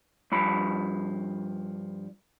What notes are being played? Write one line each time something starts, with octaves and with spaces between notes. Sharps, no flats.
G2 F3 B5